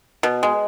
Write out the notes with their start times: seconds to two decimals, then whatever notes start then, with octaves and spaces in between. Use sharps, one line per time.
0.23 B2
0.43 G#3